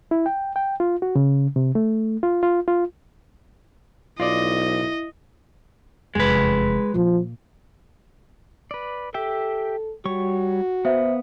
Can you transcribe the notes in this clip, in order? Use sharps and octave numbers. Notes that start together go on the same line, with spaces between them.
E4
G5
G5
F4
F#4
C#3
C3
A3
F4
F4
F4
B1 E4 F4 D5 D#5
F1 E2 G#3 B4
A#2 F3 A#3
B4 D5
G4 A4 E5 G5
G3 F#4 C#5 C#6
B3 C5 E5 F5